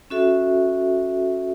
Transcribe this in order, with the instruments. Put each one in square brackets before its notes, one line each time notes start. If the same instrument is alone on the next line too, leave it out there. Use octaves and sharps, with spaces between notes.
[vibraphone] C#4 F#4 A4 E5